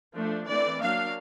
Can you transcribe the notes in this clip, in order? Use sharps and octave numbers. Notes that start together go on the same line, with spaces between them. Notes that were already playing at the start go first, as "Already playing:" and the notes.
F3 A3 D4
E3 A3 C4 D5
F#3 A#3 D4 F5